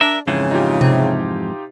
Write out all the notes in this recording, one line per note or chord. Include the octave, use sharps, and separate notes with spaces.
D4 A#4 E5
F2 G#2 C#3 E3
D#4 F4 G4
C3